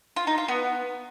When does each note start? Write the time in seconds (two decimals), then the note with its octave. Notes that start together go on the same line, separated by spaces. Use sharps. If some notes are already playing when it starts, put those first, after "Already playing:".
0.16 F4
0.27 D#4
0.38 F4
0.48 B3